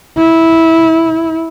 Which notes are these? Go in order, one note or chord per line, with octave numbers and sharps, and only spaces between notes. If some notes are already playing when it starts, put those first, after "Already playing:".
E4